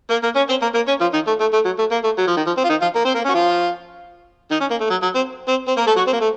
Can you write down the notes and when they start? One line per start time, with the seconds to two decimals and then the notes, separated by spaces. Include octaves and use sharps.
0.10 A#3 A#4
0.23 A#3 A#4
0.36 C#4 C#5
0.49 C4 C5
0.62 A#3 A#4
0.74 A#3 A#4
0.88 C#4 C#5
1.01 F3 F4
1.13 D#3 D#4
1.27 A3
1.40 A3
1.53 A3
1.65 F#3
1.79 A3
1.91 A#3
2.04 A3
2.18 F#3
2.27 F3
2.37 D#3
2.46 F3
2.57 C4
2.64 F4
2.69 D#3 D#4
2.82 F3 F4
2.95 A#3 A#4
3.05 C4 C5
3.14 A#3 A#4
3.24 C#4
3.29 F#4
3.34 F3 F4
4.51 D#3 D#4
4.60 C#4
4.70 A#3
4.80 A3
4.90 F#3
5.02 F#3
5.15 C4
5.48 C4
5.68 C4
5.77 A#3 A#4
5.86 A3 A4
5.96 F#3 F#4
6.07 C4
6.13 A#3
6.20 A3